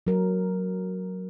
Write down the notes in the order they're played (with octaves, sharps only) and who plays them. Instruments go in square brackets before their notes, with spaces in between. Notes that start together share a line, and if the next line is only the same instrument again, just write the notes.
[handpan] F#3 A#4